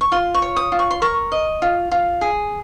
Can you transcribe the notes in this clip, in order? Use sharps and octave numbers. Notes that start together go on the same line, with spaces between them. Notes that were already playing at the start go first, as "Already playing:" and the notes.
C#6
F4 C6
C#6
C#5
D#6
F4
C#6
C6
A#4 C#6
D#5
F4
F4
G#4